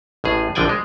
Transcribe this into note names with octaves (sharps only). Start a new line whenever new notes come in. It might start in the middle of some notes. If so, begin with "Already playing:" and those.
A1 A2 G#4
A#1 D3 F3 D5 G5 G#5
G#3